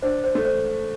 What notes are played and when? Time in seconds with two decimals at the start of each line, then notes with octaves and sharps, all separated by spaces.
0.02 D4 C5
0.24 C5
0.35 A3
0.45 C5